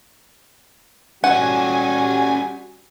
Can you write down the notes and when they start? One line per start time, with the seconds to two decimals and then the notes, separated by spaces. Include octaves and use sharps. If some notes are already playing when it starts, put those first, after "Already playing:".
1.24 G3 C#4 F#4 A4 F#5 G#5